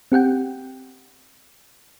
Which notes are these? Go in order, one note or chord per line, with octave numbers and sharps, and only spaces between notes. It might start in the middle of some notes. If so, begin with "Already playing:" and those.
C4 G4 F#5 G5